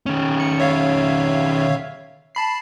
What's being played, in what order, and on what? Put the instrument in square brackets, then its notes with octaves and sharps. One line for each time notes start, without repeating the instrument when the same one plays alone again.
[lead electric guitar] D#3 C#4
[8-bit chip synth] C#7
C#5 E5 F5
A5 B5 C7